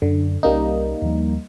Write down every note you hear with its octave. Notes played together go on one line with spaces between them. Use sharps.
F#2 D3
C2 G3 A#3 C#4 D#4
D#2 F3